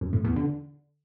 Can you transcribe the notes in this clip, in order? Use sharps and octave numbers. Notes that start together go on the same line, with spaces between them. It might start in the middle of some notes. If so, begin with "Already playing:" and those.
F#2
A2
E2
D3